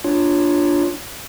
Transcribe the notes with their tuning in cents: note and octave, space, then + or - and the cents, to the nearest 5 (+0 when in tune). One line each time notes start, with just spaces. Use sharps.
D4 +0 F4 +0 C#5 +0